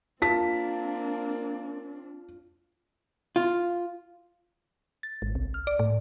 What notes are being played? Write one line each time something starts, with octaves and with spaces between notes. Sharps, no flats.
A#3 C4 D4 F4 A5 B6
F4
A6
G#1
C2
F6
D5
A2